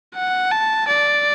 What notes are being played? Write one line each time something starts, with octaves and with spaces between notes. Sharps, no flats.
F#5
A5
D5